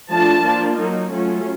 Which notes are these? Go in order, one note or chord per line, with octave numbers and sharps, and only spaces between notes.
F3 A3 D4 F4 A5
F3 A#3 D4 F4
F#3 A#3 D#4
F#3 A3 C#4 F4